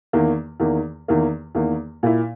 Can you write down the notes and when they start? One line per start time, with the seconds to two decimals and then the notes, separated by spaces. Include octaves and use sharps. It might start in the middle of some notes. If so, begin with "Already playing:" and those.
0.13 E2 D#3 A#3
0.60 E2 D#3 A#3
1.08 E2 D#3 A#3
1.55 E2 D#3 A#3
2.03 A#2 A#3 E4